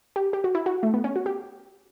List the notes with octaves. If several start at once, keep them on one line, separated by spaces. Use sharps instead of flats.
G4
G4
F#4
E4
F#4
A3
B3
C#4
F#4
G4